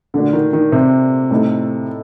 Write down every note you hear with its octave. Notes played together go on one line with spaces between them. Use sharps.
A#2 D3 A3 D4 F#4
D#3
D#3
C3
A2 A3 D#4 A4